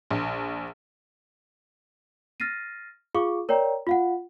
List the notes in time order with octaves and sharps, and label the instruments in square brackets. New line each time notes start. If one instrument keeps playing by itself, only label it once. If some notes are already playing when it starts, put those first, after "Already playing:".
[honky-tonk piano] A#1
[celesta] F6 A6 A#6 C7 D#7
F4 G#4 F5 C#6 D6
A#4 C#5 D5 G5 A#5
F4 F5 F#5